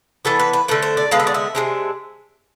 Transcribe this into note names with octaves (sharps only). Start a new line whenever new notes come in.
E3 B3 D4 A4
B4
B4
D3 A3 D4 B4
C5
D5
D3 G#3 B3 F5
E5
D5
E5
C3 G#3 D4